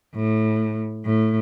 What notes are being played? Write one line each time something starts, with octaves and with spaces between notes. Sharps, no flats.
A2
A2